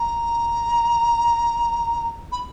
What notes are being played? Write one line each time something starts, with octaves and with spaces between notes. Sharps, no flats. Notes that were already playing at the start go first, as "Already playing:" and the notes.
Already playing: A#5
B5